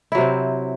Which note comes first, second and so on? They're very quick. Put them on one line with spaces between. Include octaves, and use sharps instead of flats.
E4 F#3 C3 C4